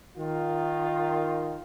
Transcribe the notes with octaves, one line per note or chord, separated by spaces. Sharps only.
D#3 F4